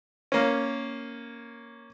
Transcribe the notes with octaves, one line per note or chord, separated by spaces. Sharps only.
A#3 C#4